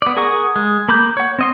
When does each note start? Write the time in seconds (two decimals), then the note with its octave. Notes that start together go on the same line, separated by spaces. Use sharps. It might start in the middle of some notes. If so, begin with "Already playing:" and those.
0.02 B3 D5
0.17 G#4 A#4 F#5 C#6 D#6
0.56 G#3
0.89 A#3 B5 D6 G6
1.17 C#5 F#5
1.39 C4 D#5 C6